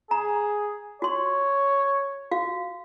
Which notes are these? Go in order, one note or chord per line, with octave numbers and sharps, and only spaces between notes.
G#4 A#5
F#4 C#5 C6
F#4 F5